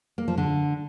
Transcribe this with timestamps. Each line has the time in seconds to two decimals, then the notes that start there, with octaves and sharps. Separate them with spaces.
0.18 A#3
0.28 F3
0.38 D3